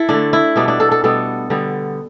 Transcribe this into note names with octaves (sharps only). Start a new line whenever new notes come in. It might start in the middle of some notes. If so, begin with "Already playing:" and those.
Already playing: E4 A4
D3 A3 D4
E4
B2 G3 B3 D4
D4
A4
A4
B2 G3 B3 A4
D3 G3 B3